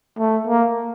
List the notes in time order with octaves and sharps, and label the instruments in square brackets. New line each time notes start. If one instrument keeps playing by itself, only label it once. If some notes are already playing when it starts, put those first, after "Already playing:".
[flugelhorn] A3
A#3